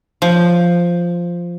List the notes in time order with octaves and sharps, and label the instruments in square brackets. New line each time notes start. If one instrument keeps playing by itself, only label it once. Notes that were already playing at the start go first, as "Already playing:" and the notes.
[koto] F3